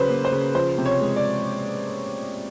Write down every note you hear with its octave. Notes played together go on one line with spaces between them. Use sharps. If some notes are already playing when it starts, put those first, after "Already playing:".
Already playing: C#3 F#3 B4 C5
A#3
C5
C#3
F3 C5
C3
C#5
G#3
D5